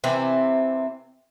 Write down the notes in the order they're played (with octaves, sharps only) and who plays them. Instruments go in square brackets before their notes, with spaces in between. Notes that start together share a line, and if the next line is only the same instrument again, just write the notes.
[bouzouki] C3 E3 C4